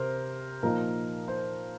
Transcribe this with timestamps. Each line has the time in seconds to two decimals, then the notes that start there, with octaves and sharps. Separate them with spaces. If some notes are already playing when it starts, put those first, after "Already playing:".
Already playing: C3 A#4 C5
0.63 A#2 F3 A#3 D#4 A#4
1.28 C5